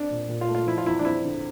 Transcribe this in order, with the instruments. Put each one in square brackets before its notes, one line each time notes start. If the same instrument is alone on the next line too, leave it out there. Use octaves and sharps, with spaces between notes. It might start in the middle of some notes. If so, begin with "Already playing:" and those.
Already playing: [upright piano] C4 [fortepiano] D4
[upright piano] A#2
A#2
[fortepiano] F4
[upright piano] A3
[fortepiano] F4
[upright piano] F3 [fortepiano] E4
[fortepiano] F4
[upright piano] E2 [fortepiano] E4
[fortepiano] D4
[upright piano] C4 [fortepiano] E4
[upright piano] D3